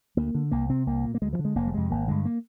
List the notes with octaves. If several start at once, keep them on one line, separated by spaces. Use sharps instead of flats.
D2 A#3
D3
C2 A#3
C3 C4
C2 A#3
A#2
A#3
D2 G#3
F3
D3
G#3
F1 A#3
G3
F2 C3 G#3
G#1 A#3
G2 D3 G#3
A#3